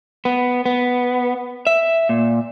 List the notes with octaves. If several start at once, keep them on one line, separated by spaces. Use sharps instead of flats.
B3
B3
E5
A#2